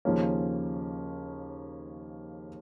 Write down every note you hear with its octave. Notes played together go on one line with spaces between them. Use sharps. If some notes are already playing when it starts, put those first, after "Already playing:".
D#2 C#3 F3 A#3 C#4